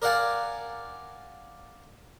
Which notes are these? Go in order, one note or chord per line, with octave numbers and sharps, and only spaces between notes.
A#4 D5 F5 F#5 G#5 A5